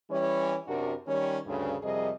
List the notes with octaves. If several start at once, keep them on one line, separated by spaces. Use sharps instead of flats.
E3 G3 C#4 E4 C#5
F#2 C3 D4 F#4 G4 A#4
D#3 G3 C#4 C#5
D2 G2 C#3
F2 C3 G3 G#4 A#4 D#5